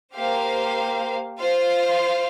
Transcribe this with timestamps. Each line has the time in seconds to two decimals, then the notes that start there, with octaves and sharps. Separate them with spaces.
0.14 A#3 G4 C5 F5
1.38 F4 C5 F5